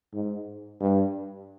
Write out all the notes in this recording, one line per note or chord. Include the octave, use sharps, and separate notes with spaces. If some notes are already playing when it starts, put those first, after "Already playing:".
G#2
G2